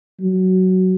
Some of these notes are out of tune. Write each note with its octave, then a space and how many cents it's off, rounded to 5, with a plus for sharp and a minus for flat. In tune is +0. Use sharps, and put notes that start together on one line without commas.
F#3 +10